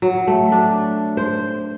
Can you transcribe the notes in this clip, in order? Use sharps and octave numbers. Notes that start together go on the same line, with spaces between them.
F#3
A3
D4
C5